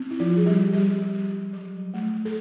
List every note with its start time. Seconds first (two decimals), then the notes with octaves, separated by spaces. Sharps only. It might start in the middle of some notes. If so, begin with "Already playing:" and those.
Already playing: C4
0.11 E4
0.20 F3 F4
0.33 G3 G#4
0.46 G3 G4
0.73 G3 G4
1.14 G3
1.53 F#3
1.94 A3
2.25 A4